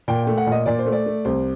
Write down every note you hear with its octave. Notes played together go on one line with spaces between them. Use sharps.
A#2 G5
A3 G5
F#5
A#2
D#5
A#2 D5
C5
A3
D5
A3
C2 C5